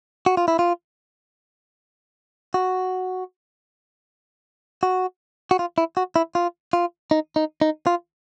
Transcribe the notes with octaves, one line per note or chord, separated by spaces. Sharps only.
F#4
F4
E4
F4
F#4
F#4
F#4
F4
E4
F#4
E4
F4
F4
D#4
D#4
D#4
F4